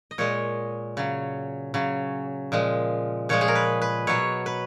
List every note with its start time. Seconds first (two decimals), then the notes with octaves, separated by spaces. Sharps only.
0.11 D#5
0.18 A#2 G#3 C#5
0.97 C#3 F#3
1.74 C#3 F#3
2.52 A#2 F3 G#3
3.29 A#2 F3 G#3 C#5
3.41 G#4
3.48 A#4
3.55 B4
3.82 B4
4.07 B2 F#3 C#5
4.46 B4